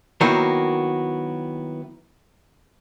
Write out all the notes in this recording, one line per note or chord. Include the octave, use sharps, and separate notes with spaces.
D#3 F#3 A#3 B3 E4